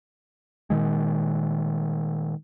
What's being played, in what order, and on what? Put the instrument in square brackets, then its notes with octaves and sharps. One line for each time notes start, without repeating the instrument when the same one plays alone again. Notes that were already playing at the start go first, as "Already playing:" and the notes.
[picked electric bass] A#2 D#3 G#3